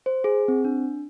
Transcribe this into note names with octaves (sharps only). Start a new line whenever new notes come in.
C5
G#4
C4
D4